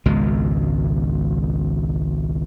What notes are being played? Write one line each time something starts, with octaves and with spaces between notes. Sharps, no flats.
G#1 C#2 B2 G#3